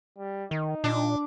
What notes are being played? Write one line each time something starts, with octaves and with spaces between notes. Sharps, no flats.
G3
D#3 D#4
A#2 D4